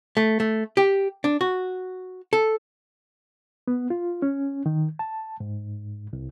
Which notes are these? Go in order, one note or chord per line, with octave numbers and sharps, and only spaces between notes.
A3
A3
G4
D4
F#4
A4
B3
F4
C#4
D#3
A5
G#2
C2